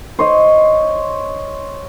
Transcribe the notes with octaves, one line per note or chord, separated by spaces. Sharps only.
C5 C#5 D#5